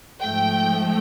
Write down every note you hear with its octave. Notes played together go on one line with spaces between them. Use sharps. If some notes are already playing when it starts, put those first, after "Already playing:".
G#2 F3 A3 G5